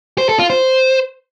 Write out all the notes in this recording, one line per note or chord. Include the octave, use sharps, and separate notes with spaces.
C5
A4
F4
C5